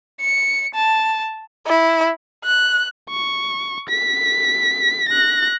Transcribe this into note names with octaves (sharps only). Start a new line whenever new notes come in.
C#7
A5
E4
F#6
C#6
B6
F#6 A#6